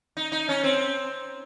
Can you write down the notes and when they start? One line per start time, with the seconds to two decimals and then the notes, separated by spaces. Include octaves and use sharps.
0.17 D#4
0.32 D#4
0.49 C#4
0.64 C4